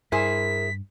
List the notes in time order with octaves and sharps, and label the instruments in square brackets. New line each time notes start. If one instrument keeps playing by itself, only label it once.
[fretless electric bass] G2 [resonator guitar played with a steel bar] E4 G#4 C5 [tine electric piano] A#4 [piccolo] B6